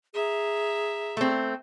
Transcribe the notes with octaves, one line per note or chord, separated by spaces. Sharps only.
G#4 E5 A#5
A3 C4